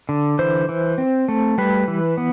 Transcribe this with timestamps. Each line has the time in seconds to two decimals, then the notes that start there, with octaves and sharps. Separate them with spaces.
0.09 D3
0.39 E3 C5
0.69 E3
0.98 C4
1.29 A3
1.58 G3 B4
1.88 E3
2.17 B3